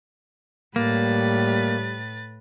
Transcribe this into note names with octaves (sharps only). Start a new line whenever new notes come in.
A2 G3 A#3 B4 A6